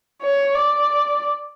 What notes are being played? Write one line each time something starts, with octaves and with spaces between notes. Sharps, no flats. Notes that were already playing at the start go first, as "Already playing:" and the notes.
C#5
D5